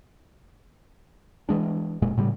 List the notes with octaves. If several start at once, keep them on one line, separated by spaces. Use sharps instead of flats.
E3 G#3 D4
F1 A#2 G#3
A2 C#3 G3